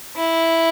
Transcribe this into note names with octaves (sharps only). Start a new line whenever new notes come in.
E4